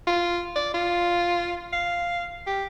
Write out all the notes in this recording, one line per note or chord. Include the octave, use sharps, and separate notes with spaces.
F4
D5
F4
F5
G4